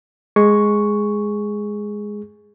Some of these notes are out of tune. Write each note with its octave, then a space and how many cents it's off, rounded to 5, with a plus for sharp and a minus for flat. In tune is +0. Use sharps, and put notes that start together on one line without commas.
G#3 +0 G#4 +0 C#6 +0